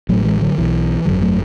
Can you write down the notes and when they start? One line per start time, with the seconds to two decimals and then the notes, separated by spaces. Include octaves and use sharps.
0.09 A1 A2 F#3 A3
0.25 E3 G#3
0.41 D3 F#3
0.58 B1 B2 E3
1.05 G#1 F#2 D3 F#3
1.21 F#3 A3